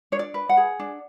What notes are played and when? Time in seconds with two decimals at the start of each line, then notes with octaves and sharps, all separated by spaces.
0.12 D4 C#5
0.19 D5
0.34 B4
0.49 F#5
0.57 G#4
0.79 D4